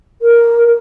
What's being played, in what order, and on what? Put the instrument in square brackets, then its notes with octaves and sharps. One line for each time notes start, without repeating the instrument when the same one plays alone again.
[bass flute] A#4